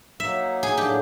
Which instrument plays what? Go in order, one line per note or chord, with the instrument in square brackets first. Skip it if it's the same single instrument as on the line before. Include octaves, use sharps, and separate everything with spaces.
[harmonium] F#3 A#3 D#4 [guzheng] E5
[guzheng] G#4
[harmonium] A2 F#3 A#3 D4 [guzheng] G4